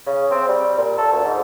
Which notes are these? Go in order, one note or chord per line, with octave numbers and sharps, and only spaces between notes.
C#3
C4
G3
A#2
A4
D2
G#2